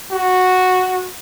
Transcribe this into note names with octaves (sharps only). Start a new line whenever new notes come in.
F#4